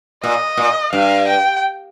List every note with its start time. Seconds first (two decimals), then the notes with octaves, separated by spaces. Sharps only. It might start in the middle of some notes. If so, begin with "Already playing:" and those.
0.23 A#2 D#5
0.57 A#2
0.92 G2 F5
1.27 G5